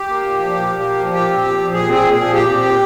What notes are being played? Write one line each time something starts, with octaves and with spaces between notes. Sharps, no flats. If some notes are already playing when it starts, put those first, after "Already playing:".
Already playing: G4
A#3
A#2
F3
A#2
A#3
A#2
F3
A#2 G4
C4
A#2
F3
A#2 G#4
C4 G#4
A#2
F3 G#4
A#2 G4
C4
A#2